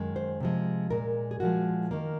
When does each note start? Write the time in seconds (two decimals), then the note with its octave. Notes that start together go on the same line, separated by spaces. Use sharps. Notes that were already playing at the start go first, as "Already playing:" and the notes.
Already playing: F#2 D#3 G#3
0.16 C5
0.40 C3 F3 G#3
0.90 A#2 G#3 A#4
1.31 G#4
1.40 A#2 F3 G#3 F#4
1.91 D#3 A#3